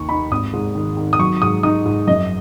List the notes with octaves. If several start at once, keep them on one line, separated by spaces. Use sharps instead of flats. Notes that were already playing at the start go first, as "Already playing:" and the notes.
Already playing: D#2 D#3 C#6
D#4 B5
G#1 D#6
G#2
D#3
D#3
D#6
F#3 C#6
G#2 D#6
D#4 D#6
G#2
F#2 D#5